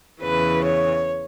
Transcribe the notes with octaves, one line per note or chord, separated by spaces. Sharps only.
E2 C#3 E3 B4
C#5